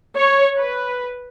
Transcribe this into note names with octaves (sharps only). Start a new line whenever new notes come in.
C#5
B4